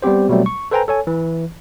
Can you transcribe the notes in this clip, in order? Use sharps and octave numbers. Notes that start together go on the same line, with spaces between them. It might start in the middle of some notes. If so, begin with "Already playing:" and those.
G3 B3 C4 G4 C5
B2 F#3 G3 A3 C4
C#6
A4 B4 C5 G5 G#5 A#5
A4 C#5 G#5
E3